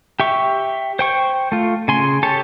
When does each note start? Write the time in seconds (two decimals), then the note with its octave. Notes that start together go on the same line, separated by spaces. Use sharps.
0.20 G4 E5 C#6
0.99 C5 G5 C#6
1.52 A3 F4
1.88 C#3 G#5 C6
2.23 G4 A4 C#5 A5